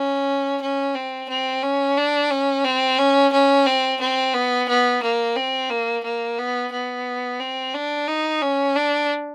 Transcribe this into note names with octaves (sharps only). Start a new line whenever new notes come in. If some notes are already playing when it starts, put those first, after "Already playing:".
Already playing: C#4
C#4
C4
C4
C#4
D4
C#4
C4
C#4
C#4
C4
C4
B3
B3
A#3
C4
A#3
A#3
B3
B3
C4
D4
D#4
C#4
D4